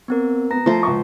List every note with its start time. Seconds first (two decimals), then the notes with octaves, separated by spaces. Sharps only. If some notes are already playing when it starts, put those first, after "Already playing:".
0.08 B3 C4 A#4
0.51 B3 A#5 A#6
0.66 F3 A3 C5
0.83 C#2 C#6